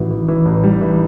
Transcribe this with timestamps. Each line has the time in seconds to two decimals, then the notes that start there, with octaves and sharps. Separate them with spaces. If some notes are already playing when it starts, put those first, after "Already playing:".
Already playing: A1 E3 F#4
0.10 E3
0.28 E3
0.45 A1
0.63 G3
0.81 E3